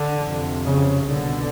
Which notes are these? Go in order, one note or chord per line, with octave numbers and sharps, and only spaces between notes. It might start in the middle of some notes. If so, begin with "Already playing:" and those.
Already playing: D3
F2 C3
C#3
C2 B2 D3